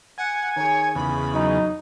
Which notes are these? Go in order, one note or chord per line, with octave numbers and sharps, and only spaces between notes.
F#5 G#5
D#3 G#4 C#5
E2 C#3 B5
F#3 D#4